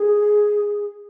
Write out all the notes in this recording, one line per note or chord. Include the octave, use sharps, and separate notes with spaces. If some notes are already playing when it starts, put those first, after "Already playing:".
Already playing: G#4